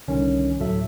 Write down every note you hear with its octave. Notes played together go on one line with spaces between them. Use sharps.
C2 D3 D#3 C#4
D2 A2 F#3 A4 E5